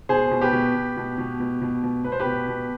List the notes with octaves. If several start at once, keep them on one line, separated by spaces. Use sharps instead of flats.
B2 G#4 C5
B2
G4 B4
B2
B2
B2
B2
B2
B2
B2
B2 B4
C5
G4 B4
B2
B2